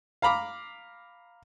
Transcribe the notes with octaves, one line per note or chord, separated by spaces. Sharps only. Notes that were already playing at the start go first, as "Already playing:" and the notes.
F5 A#5 B5 D6